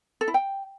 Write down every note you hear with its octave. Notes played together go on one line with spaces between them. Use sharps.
A4
E4
G5